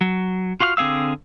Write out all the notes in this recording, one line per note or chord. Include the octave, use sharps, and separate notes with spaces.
F#3
F4 F#4 F5 C6 F6
D3 C4 G#4 F5 E6